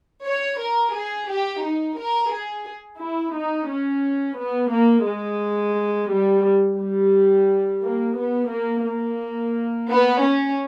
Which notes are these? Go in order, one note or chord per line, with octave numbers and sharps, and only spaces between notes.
C#5
A#4
G#4
G4
D#4
A#4
G#4
E4
D#4
C#4
B3
A#3
G#3
G3
G3
A#3
B3
A#3
A#3
B3
C#4